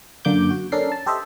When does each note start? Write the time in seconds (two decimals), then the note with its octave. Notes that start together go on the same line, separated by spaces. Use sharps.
0.25 F#2 D3 A#3 D6 G6
0.50 F#4
0.72 C#4 D4 A4 A#4 A#5 C7
0.92 A5
1.06 G4 A4 C5 D#5 E5